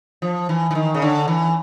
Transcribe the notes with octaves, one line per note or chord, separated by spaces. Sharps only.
F3
E3
E3
D#3
C#3
D3
E3